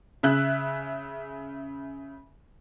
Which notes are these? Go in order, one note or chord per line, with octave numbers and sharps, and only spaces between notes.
C#3 E5 F#6